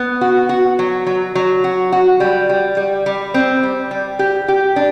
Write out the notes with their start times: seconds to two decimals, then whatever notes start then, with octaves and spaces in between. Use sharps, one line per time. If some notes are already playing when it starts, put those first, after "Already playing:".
Already playing: B3
0.21 F#4
0.49 F#4
0.79 F#3
1.06 F#3
1.35 F#3
1.64 F#4
1.92 F#4
2.20 G3
2.49 G3
2.77 G3
3.06 G3
3.34 C4
3.63 G3
3.91 G3
4.19 G4
4.48 G4
4.76 D4